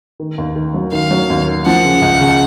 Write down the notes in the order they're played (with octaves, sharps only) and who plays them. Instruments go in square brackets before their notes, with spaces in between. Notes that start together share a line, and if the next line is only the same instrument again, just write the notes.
[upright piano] D#3
D#2
D#3
F#3
[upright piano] D#3 [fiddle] F5
[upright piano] F#3
D#2
D#3
[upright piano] F3 [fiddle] F#5
[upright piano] C#3
C#2
C#3